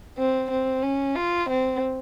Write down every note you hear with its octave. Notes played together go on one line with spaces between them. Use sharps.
C4
C4
C#4
F4
C4